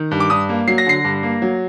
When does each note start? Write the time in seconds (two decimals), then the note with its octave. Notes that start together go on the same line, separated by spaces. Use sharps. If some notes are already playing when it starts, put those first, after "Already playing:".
Already playing: D#3
0.11 G2
0.20 D6
0.30 G2 D#6
0.49 A#3
0.67 F#3 C7
0.78 A#6
0.86 D3 C7
1.05 G2
1.23 A#3
1.42 F#3